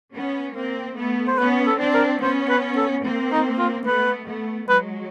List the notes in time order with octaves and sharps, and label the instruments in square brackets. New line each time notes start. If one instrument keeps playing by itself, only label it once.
[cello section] B3 C#4
A#3 C4
A3 B3
[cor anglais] C5
[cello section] B3 C#4 [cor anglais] B4
[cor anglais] A4
[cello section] C4 D4
[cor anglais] A#4
[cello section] B3 C#4 [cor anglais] C5
[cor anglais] B4
A4
[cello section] A#3 C4
[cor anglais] D#4
F4
[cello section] A3 B3 [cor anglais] B4
[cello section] A3 B3
[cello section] F#3 G#3 [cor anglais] B4